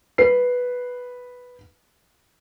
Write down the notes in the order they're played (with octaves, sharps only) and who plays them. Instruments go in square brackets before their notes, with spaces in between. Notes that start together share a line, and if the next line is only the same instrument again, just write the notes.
[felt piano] B4 C7